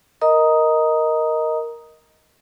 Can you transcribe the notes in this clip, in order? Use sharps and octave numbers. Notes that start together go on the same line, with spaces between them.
A#4 D#5 A#5 D#6